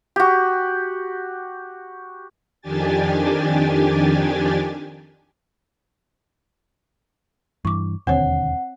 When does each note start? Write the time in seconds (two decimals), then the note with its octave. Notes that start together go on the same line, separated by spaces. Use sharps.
0.16 F#4 G4
2.62 F2 D#3 D4 G4 G#5 A6
7.65 G2 E3 C#6 D6
8.07 E1 D#2 D3 C4 C5 C#5 F#5